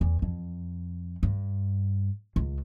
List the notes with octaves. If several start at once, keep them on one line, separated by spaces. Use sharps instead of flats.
E2
F2
G2
C#2